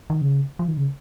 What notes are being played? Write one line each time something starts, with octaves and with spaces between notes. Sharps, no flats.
D#3
C#3
F3
D#3
C#3